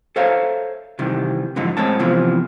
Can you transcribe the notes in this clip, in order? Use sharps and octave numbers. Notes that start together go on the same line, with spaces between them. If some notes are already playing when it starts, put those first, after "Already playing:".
A4 C5 C#5 E5 F5 A#5
C3 D#3 E3 G3
F2 G#2 D3 E3 F#3
A2 G#3 C4 C#5 A5
C3 E3 F3 B3 C4